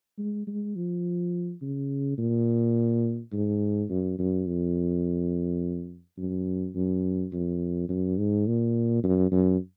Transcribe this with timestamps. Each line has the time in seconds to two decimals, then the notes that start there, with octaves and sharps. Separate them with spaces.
0.18 G#3
0.47 G#3
0.76 F3
1.61 C#3
2.18 A#2
3.32 G#2
3.89 F#2
4.19 F#2
4.46 F2
6.18 F#2
6.75 F#2
7.32 F2
7.89 F#2
8.18 G#2
8.47 A#2
9.03 F#2
9.31 F#2